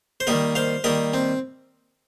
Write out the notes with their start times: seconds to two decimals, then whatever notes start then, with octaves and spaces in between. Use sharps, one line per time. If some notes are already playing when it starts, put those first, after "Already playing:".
0.20 C5
0.27 D#3 G3 A#3 A#4 D#5
0.55 C5 F5
0.84 D#3 G3 A#3 A#4 D#5
1.14 C4